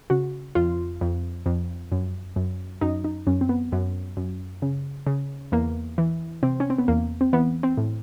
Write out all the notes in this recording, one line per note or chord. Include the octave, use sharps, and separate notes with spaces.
C#3 F#4
F2 F4
F2
F2
F#2
F#2
F#2 D#4
D#4
F#2 C#4
C4
B3
F#2
F#2
C#3
C#3
E2 A#3
E3
C3 C4
C#4
C4
B3
E2 A#3
C4
E3 B3
C4
A2